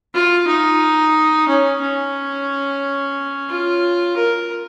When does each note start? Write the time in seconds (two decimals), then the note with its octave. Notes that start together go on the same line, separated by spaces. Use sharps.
0.14 F4
0.47 D#4
1.48 C#4
1.81 C#4
3.50 F4
4.17 A#4